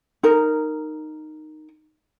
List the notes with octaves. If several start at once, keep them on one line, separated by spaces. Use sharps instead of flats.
D#4 A#4